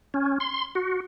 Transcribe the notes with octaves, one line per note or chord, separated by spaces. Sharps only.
C#4
C6
F#4